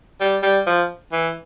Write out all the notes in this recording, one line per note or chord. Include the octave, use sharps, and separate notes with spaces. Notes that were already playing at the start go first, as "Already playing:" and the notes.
G3
G3
F3
E3